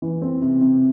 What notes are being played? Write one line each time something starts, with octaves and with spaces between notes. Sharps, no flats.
E3
C4
C3
C3